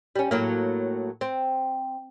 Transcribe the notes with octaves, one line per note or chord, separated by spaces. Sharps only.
G3 C#4
A2 F#3 A#3
C4